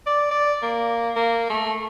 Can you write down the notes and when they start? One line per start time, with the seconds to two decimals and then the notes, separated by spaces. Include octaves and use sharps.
0.06 D5
0.31 D5
0.62 A#3
1.16 A#3
1.50 A3